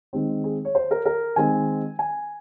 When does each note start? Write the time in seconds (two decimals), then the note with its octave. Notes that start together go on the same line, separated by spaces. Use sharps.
0.13 D#3 G#3 C4
0.44 G#4
0.65 C#5
0.75 C5
0.91 A#4
1.05 A#4
1.36 D#3 G#3 C4 G#5
1.99 G#5